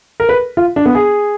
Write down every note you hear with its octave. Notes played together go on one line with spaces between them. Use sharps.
A#4
B4
F4
D4
B3
G#4